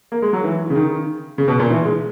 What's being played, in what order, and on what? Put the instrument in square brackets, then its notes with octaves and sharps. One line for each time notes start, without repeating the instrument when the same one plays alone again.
[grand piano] A#3
G#3
F#3
E3
C#3
D#3
C#3
B2
A#2
E3
G#3